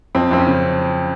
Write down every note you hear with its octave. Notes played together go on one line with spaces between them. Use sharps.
F2 C4
F2 C4
C#4
C#3